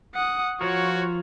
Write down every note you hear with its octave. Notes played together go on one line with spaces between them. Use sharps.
F#5 D#6
F3 F4 F#4 A#4 C#5